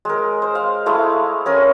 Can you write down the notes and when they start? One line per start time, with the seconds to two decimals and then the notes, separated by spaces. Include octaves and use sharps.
0.05 G#3 A#4
0.42 C5
0.55 F5
0.86 G#3 A3 E4 F5
1.46 C#4 A#4 G#5